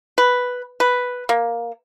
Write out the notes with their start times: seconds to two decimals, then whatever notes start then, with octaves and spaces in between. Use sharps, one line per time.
0.18 B4
0.80 B4
1.29 A#3